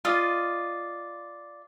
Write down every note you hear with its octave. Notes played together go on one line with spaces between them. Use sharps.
F4 D5 D#5